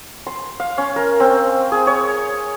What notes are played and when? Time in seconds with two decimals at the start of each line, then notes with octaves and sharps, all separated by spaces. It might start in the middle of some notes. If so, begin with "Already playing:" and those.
0.27 C6
0.60 F5
0.78 C#4
0.96 A#4
1.20 C4
1.72 G#4
1.87 C#5